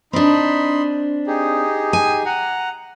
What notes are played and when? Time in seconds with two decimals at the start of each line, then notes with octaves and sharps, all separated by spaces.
0.13 C4 D4 D#4 B5 C6
1.27 D#4 G4 G#4
1.93 G#5
2.26 F#5 A#5